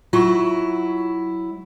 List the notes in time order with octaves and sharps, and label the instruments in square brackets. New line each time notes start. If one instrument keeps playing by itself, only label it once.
[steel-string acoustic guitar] F#3 E4 [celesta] F4 C#6